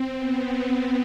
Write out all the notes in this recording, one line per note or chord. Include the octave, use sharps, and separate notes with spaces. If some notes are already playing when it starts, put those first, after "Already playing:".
Already playing: C4
B3